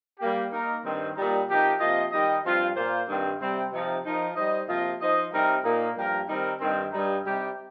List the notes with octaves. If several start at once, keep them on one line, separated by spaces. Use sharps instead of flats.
G3 A#3 G4
A#3 D#4 A#4
G2 D#3 C4
A#2 G3 D#4
C3 F3 D#4 G4 A#4
C3 F3 A#3 F4 D#5
D#3 G3 D#4 G4 D#5
G2 F3 C4 F4
A#2 A#3 F4 C5
G2 D#3 C4
C3 G3 C4
C3 F3 D#4
F3 D#4 A#4
G3 D#4 C5 D#5
C3 F3 A#3 F4 D#5
F3 D#4 C5 D#5
C3 G3 C4 D#4 A#4
A#2 A#3 D#4
G2 F3 A#3 G4 A#4
D#3 G3 C4 D#4 A#4
G2 D#3 C4
G2 G3 D#4
C3 G3 D#4 G4